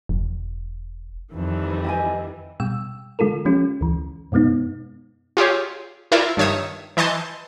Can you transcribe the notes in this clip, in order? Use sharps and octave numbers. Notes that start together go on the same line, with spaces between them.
E1
F2 D#3 E3 G3
G4 D#5 G#5
B2 G3 G5 E6
D3 G#3 F4 A4 A#4
F3 G#3 C#4 F4 G4
D2 E3
F#2 B2 G#3 B3 D#4
F4 G4 G#4 C#5
E4 F4 A#4 D5 E5 F5
G2 D#3 C#5 E5 D#6
E3 D#5 A5 C6 G6